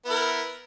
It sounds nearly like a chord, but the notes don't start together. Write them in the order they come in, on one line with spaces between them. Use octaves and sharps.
B3 E4 A#4